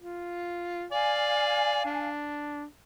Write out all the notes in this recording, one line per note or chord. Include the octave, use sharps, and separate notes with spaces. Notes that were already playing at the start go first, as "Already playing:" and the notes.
F4
D5 F5 G#5
D4